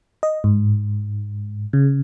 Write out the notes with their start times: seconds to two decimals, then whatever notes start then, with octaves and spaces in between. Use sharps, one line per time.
0.23 D#5
0.44 G#2
1.73 C#3